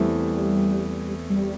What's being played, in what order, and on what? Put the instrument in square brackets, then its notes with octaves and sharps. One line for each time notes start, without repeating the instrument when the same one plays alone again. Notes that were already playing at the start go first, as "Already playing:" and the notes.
Already playing: [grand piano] E2 E3 A3 C4 E4 [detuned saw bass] G3
[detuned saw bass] G3